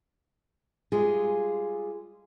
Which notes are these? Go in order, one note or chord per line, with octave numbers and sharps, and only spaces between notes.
G3 G#3 F4 G#4